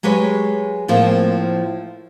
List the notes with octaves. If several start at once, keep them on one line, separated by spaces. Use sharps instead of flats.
F#3 G#3 G4 B4 C#5
A2 F3 A#3 C4